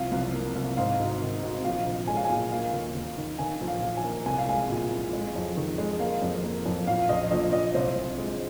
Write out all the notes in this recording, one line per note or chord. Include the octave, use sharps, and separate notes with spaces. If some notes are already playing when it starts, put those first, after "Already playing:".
Already playing: C2 F3 F5
C2
A#3
C2
G#2 F5
G#1
D#3
G#1
A#1 F5
A#1
G#3 G#5
F5
A#2 G#5
A#3 F5
D#2
D#2
D#3
D#3 G#5
A#1
F5
A#1
G#5
A#3
C2 G#5
F5
G#3 G#5
A#2
C2
G#3
F2
D#3
G#3
A#3 F5
F2
A#3
F2
A#2 F5
A#1 D#5
A#1 D#5
A#1 D#5
C2 C5
C2
G#3